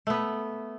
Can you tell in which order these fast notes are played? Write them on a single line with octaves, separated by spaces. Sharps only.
A3 B3 B4